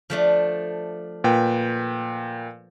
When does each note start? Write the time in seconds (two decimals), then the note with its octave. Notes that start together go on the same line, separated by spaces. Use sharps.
0.10 F3 A3 D4
1.24 A#2 B4 G5